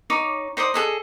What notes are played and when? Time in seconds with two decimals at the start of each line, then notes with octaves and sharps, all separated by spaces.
0.10 D#4 C#5 D6
0.57 D#4 C5 D5 D#6
0.74 G#4 A4 D#5